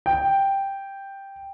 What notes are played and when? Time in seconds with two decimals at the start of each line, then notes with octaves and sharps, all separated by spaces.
0.06 G5